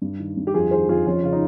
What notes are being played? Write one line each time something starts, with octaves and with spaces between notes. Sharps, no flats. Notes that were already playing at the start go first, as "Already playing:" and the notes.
G2
D#3
G2
G4
F2 F4 G#4
D#3 G#4 C5
F2 F4 G#4
F2 C#4 F4
C#3 F4
D#4